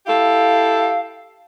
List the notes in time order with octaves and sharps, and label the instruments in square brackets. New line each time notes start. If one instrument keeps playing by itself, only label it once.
[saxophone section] E4 G4 A4 [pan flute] F5